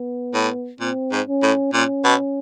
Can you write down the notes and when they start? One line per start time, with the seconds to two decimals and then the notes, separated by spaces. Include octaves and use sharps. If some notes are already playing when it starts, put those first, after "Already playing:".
Already playing: B3
0.34 A2
0.80 A#2 C4
1.12 G#2
1.28 C#4
1.43 A2
1.73 A#2 C#4
2.05 B2